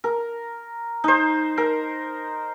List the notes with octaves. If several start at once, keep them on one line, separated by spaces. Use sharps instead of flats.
A#4
D#4 C5
A#4